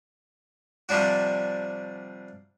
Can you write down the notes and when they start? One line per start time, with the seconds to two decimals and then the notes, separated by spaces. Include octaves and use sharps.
0.89 C3 F3 G3 D4 F#4